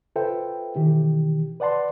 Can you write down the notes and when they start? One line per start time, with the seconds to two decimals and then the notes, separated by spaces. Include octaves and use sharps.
0.16 F4 A4 B4 C5 E5 G5
0.75 B2 D#3 E3 G4
1.60 B4 D5 F#5 A5 C6